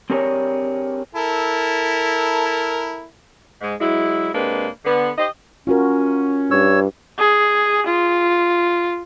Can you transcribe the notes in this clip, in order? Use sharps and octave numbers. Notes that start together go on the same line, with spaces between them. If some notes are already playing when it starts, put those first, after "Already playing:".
C4 D4 G4 G#4 A#4 C#5
E4 A4 A#4
G#2 G#3
F#3 G#3 E4
C3 G#3 A#3 D4 B4
D3 B3
G4 C5 D#5
C#4 F4 F#4 A#4
G2 C#5 E6
G#4
F4